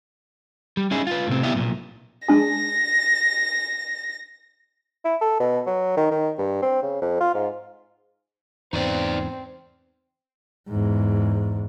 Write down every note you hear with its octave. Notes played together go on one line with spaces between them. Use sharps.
G3
C#4 D#4 E4 G#4
F4 B4
A2 C3 C4
G3 B3 E4 G4 E5 F5
B1 A#2
G#3 D4 G#4 A#6
E4
A4
B2
F#3
D#3
D#3
G2
C4
C#3
F2
F4
G#2
E2 G#2 C#3 C4 D#4 B4 D5
E2 G#2